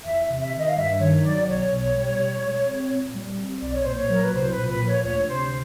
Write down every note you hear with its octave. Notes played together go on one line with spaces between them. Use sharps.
E2 E5
C3
E5
D#3
D#5
F5
G2 E5
D#3 C#5
F#3 D5
B1 C#5
B2
G3
B2
G#3
C4
A#2
G3
C4
B1 D5
C#5
A#2 C5
C#5
F#3 A#4
B4
C2 C5
B4
A#2
B4
F3
C#5
D2 C#5
C3 C5